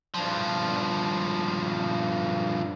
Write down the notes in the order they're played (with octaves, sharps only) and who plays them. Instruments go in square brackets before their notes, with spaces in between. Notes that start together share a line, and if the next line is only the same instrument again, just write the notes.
[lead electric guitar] G2 F3